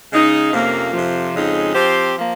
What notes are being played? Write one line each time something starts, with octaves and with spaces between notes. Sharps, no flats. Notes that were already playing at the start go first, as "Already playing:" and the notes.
C#3 G#3 D#4
F2 C3 F3 A#3 C#4
F2 C3 F3
F2 C#3 G#3 D#4
F3 C4 G4 C5
F3 A#3